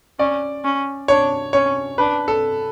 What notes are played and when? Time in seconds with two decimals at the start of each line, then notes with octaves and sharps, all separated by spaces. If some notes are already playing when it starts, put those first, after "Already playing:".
0.19 C#4 D5
0.64 C#4
1.08 D4 C#5
1.53 C#4 C#5
1.98 D4 B4
2.28 A4